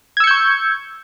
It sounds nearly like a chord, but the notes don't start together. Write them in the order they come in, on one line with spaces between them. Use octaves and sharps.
G#6 E6 C#7 G6 C#6